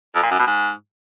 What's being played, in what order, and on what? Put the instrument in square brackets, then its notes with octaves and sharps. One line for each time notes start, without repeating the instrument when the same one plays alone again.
[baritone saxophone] F2
A#2
F#2
B2
G#2